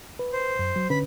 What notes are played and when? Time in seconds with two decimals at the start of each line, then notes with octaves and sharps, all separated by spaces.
0.19 B4
0.33 C5
0.59 F#2
0.76 F#3
0.90 D3 C#4 B4 B5